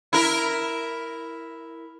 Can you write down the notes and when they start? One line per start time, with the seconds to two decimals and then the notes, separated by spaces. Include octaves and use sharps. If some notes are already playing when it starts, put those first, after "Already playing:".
0.13 E4 A#4